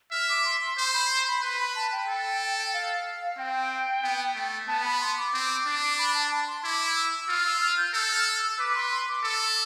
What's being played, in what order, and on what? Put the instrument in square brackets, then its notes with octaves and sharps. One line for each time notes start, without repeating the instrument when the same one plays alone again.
[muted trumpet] E5 [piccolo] F6
[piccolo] D6
C6
C6
[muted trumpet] C5 [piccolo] C6
[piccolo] B5
C6
B5
[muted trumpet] B4 [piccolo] C6
[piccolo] B5
A5
G5
[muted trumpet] A4
[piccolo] F5
[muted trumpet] C4 [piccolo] G5
[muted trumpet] B3
A3
[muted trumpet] B3 [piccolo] A5
[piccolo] B5
C6
D6
[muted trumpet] C4
D4
[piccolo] B5
A5
A5
C6
[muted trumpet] E4 [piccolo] D6
[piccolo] E6
[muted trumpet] F4 [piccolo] F6
[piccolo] E6
F6
G6
[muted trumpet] A4 [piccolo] E6
[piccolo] F6
E6
E6
[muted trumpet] B4 [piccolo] D6
[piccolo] C6
C6
D6
[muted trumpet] A4 [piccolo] E6